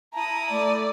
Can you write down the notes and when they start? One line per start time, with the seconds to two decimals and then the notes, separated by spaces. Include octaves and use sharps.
0.14 E4 A5 A#5 D#6
0.50 A3 D5